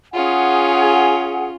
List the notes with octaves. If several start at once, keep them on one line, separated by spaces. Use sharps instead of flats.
C#4 F4 G#4 F#5 G#5